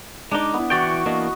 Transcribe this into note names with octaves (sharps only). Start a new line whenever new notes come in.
G#3 D4 D#4 D5
B3 E4
E3 F#4 D5 G5 C#6
E3 A#3 D4 D#5